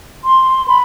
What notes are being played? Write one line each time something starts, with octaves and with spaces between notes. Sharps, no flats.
C6
B5